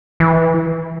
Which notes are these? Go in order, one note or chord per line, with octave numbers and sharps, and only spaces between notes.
E3